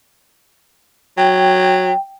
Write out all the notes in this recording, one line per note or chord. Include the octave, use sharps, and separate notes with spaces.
F#3 G5